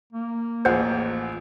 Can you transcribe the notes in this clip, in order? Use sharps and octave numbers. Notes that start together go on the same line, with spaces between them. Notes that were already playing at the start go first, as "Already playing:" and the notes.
A#3
A1 F3 G#4 C5 F#5